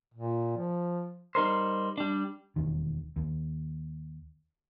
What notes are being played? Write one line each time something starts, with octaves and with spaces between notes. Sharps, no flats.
A#2
F3
G3 D#4 A#4 C5
G3 D4
E1 D#2 D#3
D#2